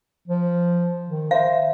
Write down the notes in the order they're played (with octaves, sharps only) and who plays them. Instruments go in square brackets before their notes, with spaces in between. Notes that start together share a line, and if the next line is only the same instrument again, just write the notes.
[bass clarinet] F3
D#3
[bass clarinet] C5 [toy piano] E5 F5